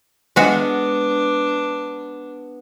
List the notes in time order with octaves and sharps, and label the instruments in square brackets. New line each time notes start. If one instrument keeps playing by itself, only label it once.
[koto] G#3 F#4 F5 [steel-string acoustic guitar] B3 [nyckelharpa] D4